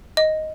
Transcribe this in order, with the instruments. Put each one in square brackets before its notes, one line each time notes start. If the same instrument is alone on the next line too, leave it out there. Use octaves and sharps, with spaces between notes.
[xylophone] D#5